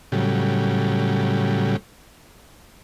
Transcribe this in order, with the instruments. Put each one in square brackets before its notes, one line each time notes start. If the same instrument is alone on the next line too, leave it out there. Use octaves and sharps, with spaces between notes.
[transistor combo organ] A2 C#3 F#3 G3